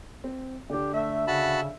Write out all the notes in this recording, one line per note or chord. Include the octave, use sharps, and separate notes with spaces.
C4
D3 D4 G4
A3 E5
C#3 F#4 A5 B5